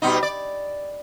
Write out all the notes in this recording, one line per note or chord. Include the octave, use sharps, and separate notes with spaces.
B2 G3 D#4
D5